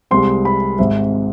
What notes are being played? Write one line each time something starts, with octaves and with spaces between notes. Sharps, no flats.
C2 C3 G#3 C4 C6
B5
G#1 G#2 G#3 C4 E5